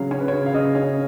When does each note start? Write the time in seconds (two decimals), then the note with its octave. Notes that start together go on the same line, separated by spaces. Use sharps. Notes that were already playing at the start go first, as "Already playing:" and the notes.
Already playing: C#3 F#3 C#4 F5
0.11 C#4 C#5
0.20 B4
0.28 C#3 C#5
0.46 F5
0.54 C#3 D#5
0.75 C#4